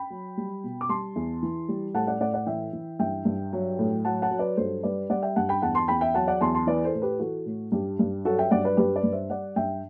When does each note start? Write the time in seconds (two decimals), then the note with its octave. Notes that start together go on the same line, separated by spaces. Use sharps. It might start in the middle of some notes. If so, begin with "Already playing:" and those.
Already playing: G5 B5
0.10 F#3
0.37 G3
0.64 B2
0.81 D6
0.89 G3 A5 C6
1.16 E2
1.43 E3
1.69 G3
1.94 A2 F#5 A5
2.07 D5 F#5
2.20 A2 D5 F#5
2.34 D5 F#5
2.46 E3 E5 G5
2.73 E3
2.99 G2 E5 G5
3.25 G2
3.53 F#3
3.79 A2
4.05 F#3 F#5 A5
4.22 F#5 A5
4.31 F#3
4.39 B4 D5
4.57 G2 A4 C5
4.83 G3 B4 D5
5.10 G3 D5 F#5
5.22 E5 G5
5.36 G2 F#5 A5
5.49 G5 B5
5.62 E2 F#5 A5
5.75 A5 C6
5.88 E2 G5 B5
6.01 E5 G5
6.14 F#3 F#5 A5
6.27 D5 F#5
6.41 E2 A5 C6
6.55 A5 C6
6.67 E3 B4 D5
6.85 A4 C5
6.94 A2
7.02 G4 B4
7.19 E3 F#4 A4
7.46 A2
7.72 G2 G4
7.99 G2
8.25 F#3 F#4 A4
8.39 E5 G5
8.51 G2 D5 F#5
8.65 B4 D5
8.77 G2 G4 B4
8.96 B4 D5
9.03 G2
9.12 C5 E5
9.30 G3 D5 F#5
9.56 G2 E5 G5